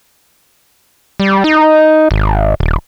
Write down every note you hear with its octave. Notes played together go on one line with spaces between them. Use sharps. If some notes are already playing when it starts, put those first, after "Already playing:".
G3
D#4
G#1
D#1